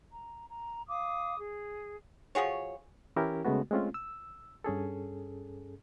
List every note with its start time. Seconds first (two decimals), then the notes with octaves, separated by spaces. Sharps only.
0.12 A#5
0.50 A#5
0.88 F5 D6 D#6
1.39 G#4
2.35 F3 F#4 G#4 C#5
3.16 E3 C#4 E4 G4 A#4
3.45 C#3 G#3 A3 B3 F#4
3.71 G#3 A3 C4 C#4 F4
3.94 E6
4.64 G2 C#4 G#4 A4